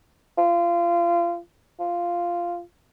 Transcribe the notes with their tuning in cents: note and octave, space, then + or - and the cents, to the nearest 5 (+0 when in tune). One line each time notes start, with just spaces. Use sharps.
F4 -25
F4 -5